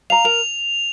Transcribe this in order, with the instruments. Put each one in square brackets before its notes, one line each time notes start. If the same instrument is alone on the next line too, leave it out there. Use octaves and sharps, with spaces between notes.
[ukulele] F5 A#5 [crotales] F7
[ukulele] A#4 [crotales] F7